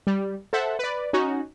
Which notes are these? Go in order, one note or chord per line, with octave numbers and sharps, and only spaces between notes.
G3
A4 C5 E5 F#5
B4 D5
C#4 D#4 F#4